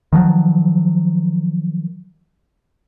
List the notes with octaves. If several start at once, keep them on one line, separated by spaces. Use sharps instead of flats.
D#3 F3 F#3